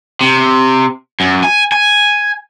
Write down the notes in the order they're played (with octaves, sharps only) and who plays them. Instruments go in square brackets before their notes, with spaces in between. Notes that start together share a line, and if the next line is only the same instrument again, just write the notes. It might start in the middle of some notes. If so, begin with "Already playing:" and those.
[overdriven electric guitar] C3
F#2
G#5
G#5